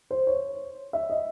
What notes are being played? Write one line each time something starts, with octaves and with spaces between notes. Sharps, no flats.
C5
C#5
E5
D#5